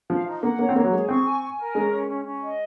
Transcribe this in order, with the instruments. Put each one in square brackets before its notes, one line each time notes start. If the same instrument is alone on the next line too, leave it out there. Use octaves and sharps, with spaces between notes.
[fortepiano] F3 [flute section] F5
[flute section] D#4
[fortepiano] A#3 [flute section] F#5
[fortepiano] A#3 [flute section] C#5
[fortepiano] C4
[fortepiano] A#3 [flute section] C#5
[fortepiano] F#3
[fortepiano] G#3 [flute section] G#4
[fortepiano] C4 [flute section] C#6
[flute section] G#5
G#5
A#4
[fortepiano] G#3 [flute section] C#4
[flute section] C#4
C#4
C#4
D#5